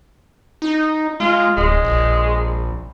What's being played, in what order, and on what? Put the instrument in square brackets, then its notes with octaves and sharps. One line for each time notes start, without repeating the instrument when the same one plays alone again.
[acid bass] D#4
[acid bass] G#3 [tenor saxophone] F4
[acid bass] D1 [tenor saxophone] G#3
[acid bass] A#1